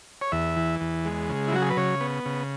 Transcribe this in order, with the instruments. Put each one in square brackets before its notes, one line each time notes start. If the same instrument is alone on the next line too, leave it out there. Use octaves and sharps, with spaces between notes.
[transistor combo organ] C#5
E2 E5
E3
E2
G#3
C#3
E4
F#3 F#4
G#4
B4
C#3 C#5
B3
C#3